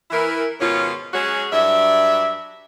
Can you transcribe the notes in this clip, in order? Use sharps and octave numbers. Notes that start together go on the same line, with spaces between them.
E3 E4 A#4
G#2 B2 D#3 C#4 F4
F#3 G#3 C#4 F#4 G#4 C#5
G2 F#3 D5 E5